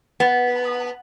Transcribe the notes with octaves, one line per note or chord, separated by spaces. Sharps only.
B3